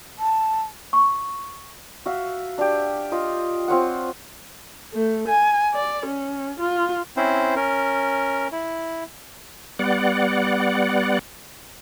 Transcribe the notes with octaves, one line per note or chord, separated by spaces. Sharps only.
A5
C#6
F#4 E5 F5
D4 G4
F4 D#5
C4 F4 C#5 F#5
A3
G#5
D5
C#4
F4
C4 C#4 E4 C5
C#4 A#4
E4
G3 B3 D5 F#5